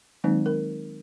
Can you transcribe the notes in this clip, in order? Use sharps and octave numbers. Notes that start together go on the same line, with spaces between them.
D#3 F#3 G#3 A#3 C4 D#4
A#4